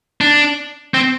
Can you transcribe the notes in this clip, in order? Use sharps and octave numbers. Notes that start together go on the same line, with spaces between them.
D4
C4